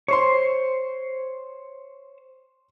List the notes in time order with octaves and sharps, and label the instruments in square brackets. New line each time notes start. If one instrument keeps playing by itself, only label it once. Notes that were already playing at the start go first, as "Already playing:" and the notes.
[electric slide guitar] C5 C#5 [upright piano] C6 C#6